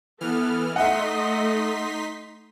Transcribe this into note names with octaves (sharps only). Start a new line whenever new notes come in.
E3 B3 A4 F6
A3 D#4 D#5 E5 F#5 C6 B6